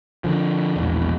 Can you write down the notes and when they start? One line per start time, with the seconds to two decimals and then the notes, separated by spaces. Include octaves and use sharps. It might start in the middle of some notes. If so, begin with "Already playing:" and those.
0.24 D3 F3
0.76 E1 A#1 E2